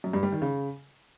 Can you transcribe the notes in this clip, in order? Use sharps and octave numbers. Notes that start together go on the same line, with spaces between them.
F#2
G2
G3
D#3
C#3